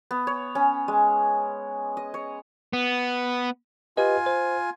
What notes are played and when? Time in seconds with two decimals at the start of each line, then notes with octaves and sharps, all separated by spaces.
0.11 B3
0.27 C#5
0.55 C#4
0.88 G#3
1.97 D#5
2.14 C#5
2.73 B3
3.97 F4 G4 B4 D#5 G#5
4.26 C5